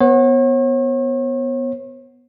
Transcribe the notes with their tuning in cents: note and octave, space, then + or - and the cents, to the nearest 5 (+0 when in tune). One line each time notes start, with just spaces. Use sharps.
B3 +0 C#5 -40